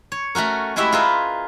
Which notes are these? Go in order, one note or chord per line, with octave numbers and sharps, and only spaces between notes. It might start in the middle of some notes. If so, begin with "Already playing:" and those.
C#5
A3 C#4 F#4 A#4
G#3 A3 E4 F#4 G4 E5
F4 G#4 A#4 B4 E5